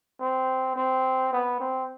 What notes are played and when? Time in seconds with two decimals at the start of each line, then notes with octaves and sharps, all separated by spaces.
0.20 C4
0.76 C4
1.33 B3
1.60 C4